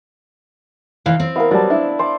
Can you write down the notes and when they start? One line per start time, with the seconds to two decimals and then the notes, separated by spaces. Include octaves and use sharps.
1.06 C3 E3 F5
1.20 C4
1.36 B3 E4 A#4 F5
1.51 F#3 G3 D5 A5
1.70 D4 E4 E5 F5
1.99 C5 D5 D6